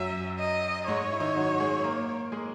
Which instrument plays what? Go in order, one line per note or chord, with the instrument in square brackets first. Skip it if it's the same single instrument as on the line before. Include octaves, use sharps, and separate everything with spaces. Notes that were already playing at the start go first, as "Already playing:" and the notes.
Already playing: [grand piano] F#2 F#3 [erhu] E5
[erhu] D#5
[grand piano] G#2 G#3 [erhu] C#5
[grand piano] E4
D#3 D#4
F#3 F#4
F#4
G#3 G#4
A#3 A#4
G#3 G#4